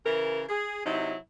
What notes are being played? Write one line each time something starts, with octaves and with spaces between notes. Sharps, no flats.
C#3 E3 A#4
G#4
C3 F#3 D#4 E4